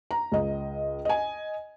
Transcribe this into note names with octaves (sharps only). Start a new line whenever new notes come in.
A#5
C#2 D#5
D#5 G#5